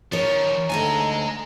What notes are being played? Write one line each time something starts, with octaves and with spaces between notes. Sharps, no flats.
D#3 F3 A#4 C#5
D2 G#2 A4 D#5 G#5 A#5